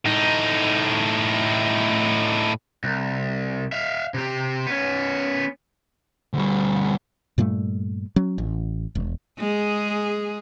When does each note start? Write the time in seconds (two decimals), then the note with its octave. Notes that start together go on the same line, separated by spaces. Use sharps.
0.05 A2 D#4
2.84 C2
3.72 E5 F5
4.14 C3 G4
4.67 B3 C#4
6.33 D2 G3
7.38 G2 A#2 G3 A3
8.16 F#3 C#4
8.38 A1
8.95 E1
9.39 G#3 G#4